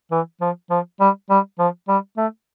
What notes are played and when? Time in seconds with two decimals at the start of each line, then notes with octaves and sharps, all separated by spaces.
0.11 E3
0.41 F3
0.70 F3
1.00 G3
1.30 G3
1.59 F3
1.88 G3
2.17 A3